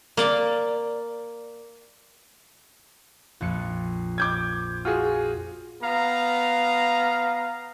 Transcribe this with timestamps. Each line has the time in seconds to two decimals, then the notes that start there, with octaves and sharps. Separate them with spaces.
0.17 A#3 D5
3.41 A#1 F2 C#7
4.18 D6 G6 G#6
4.85 F4 F#4 G#4
5.81 B3 F5 A#5